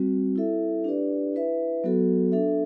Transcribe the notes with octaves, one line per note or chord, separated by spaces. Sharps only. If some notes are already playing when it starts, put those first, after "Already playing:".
Already playing: G3 C4 F#4
E4 A4 E5
D4 G4 B4 D5
E4 B4 E5
F#3 B3 F#4 A4
D4 A4 E5